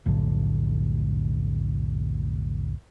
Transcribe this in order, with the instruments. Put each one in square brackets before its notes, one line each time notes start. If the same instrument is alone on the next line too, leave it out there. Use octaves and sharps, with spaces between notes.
[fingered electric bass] F1 B1 A2 D3